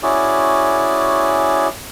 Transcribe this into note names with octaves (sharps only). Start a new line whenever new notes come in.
C#4 E4 F#4 G#4 D5